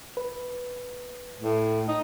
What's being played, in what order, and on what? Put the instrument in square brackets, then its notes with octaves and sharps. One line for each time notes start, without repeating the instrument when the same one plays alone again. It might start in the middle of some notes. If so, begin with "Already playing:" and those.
[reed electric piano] B4
[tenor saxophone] A2
D#4